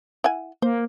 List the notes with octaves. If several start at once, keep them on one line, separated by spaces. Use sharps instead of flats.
E4 F#5 G#5
A#3 C5